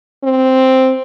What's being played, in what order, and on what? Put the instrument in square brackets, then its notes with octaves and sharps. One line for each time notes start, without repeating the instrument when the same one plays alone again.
[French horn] C4